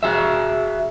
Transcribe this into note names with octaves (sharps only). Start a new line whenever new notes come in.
F#4 G#4 E5